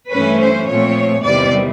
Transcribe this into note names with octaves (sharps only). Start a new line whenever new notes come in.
G2 E3 A3 C#4 B4
C5
A#2 F3 A3 C4 C#5
E2 C3 D#3 G3 D5